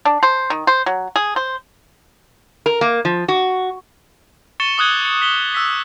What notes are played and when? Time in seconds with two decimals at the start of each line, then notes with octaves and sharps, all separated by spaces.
0.05 D4
0.23 C5
0.50 D#3
0.67 C5
0.86 F#3
1.16 G#4
1.36 C5
2.66 A#4
2.81 A#3
3.05 F3
3.28 F#4
4.60 C#6 A6 C#7 E7 G7
4.78 D6 D#6 F#6 G#6 G7
5.05 C#7
5.22 B6 F7 G7
5.54 E6 F#6 B6